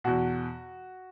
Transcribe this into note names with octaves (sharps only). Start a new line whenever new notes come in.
E2 B2 F#4